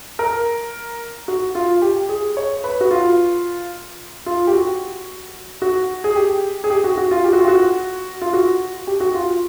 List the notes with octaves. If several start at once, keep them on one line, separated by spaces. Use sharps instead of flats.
A#4
F#4
F4
G4
G#4
C#5
B4
F#4
F4
F4
G4
F#4
F#4
G#4
G4
G#4
G4
F#4
F#4
F4
G4
F#4
F4
F#4
F4
F#4
G4
F#4
F4